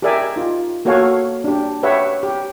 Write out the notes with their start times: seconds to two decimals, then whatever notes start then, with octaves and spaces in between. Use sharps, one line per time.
0.02 G4 G#4 A#4 D5 E5 G#5
0.36 D#4 F4
0.85 A#3 F#4 A4 C#5 F5 G#5
1.44 D4 G4
1.83 G4 B4 C#5 E5 F#5
2.23 G4